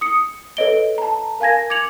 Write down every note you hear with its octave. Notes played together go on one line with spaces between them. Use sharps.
D#6 C#7
A4 B4 C#5 D#5 D7 G7
A5 A#5
A#4 F5 G#5 G#6 A#6
D6 G#6 C#7 F7 F#7